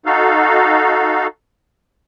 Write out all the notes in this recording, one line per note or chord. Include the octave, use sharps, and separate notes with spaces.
D#4 F#4 A4 F5